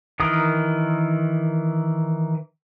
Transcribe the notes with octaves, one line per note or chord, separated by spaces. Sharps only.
D#3 E3 A#4 D#6